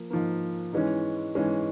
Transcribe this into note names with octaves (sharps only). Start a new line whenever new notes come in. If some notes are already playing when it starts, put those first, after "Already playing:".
Already playing: F3 A#3
G#2 F3 A#3
G#2 E3 G#3 C#4
G#2 E3 G#3 C#4